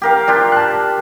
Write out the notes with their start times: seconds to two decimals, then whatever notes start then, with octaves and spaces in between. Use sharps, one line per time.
0.02 G4 A#4 F5
0.28 D4 F4 G4
0.52 A5 F#6